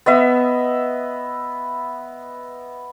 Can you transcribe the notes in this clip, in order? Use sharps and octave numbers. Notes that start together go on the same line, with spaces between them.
B3 D#5 E5